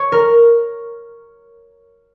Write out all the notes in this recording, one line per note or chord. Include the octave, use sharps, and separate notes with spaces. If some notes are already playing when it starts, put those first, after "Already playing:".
Already playing: C#5
A#4